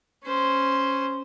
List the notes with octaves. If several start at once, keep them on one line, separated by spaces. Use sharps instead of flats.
C#4 C5